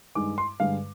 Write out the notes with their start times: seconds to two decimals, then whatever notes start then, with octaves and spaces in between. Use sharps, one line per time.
0.15 G2 D#3 G#3 D6
0.38 C6
0.60 G2 D3 G#3 F5